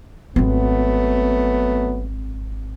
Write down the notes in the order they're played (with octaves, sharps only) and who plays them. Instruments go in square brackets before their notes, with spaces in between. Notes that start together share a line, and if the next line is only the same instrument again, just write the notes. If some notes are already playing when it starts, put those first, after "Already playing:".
[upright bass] G#1 C4 [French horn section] F#3 A3 B3